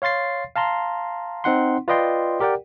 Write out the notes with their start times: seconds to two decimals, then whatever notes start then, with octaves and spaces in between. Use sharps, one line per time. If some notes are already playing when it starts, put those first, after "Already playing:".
0.02 C#5 F5 C6 A6 C7
0.56 F5 A5 A#5 C6
1.44 C4 D#4 F#5 C6
1.88 F4 B4 D5 D#5 G5 C6
2.40 G4 A#4 D5 F#5 G5